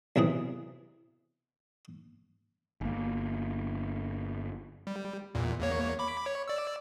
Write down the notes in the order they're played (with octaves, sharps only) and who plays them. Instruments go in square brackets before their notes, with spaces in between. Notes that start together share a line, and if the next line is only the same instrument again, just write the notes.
[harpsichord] B1 C3 E3 G#4
[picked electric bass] G1 A#3
[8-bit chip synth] G3
E2 A#2
E2 A#3 C#5
B5 D6
C#5
D5 E6